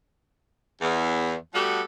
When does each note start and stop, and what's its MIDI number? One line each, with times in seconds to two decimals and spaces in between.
0.82 1.34 40
1.54 1.82 55
1.54 1.82 57
1.54 1.82 59
1.54 1.82 66
1.54 1.82 67
1.54 1.82 69